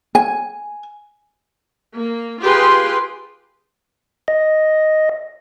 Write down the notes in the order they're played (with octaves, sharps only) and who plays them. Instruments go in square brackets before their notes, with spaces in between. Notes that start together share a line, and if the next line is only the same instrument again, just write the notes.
[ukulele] G#5
[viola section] A#3
F4 G4 G#4 B4 C6
[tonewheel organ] D#5